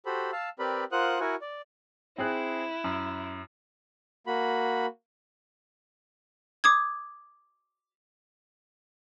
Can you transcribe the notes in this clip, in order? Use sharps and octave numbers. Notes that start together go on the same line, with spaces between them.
F#4 G4 A4 C5 B5
F5 A5 E6
C4 G4 A#4 B4 D5 B5
F4 A#4 C5 F#5 D#6 F#6
E4 F#4 A#4 F#5 G#5
D5
C4 E4 G#4 F#6
F#2
A#3 F#4 B5
D6 D#6 G#6